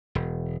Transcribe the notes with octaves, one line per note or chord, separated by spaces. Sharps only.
E1